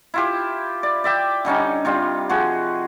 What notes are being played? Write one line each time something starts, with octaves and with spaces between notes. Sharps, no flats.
E4 F4 G4
D5
D5 E5 G5
D3 G3 C#4 D#4
C3 G3 F4
F3 F#4 G#4 C5